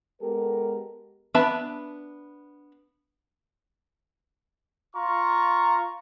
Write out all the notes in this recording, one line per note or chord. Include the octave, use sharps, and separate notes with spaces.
G#3 B3 G4 A4 A#4
B3 D4 E5 A5 B5
F4 A#5 C#6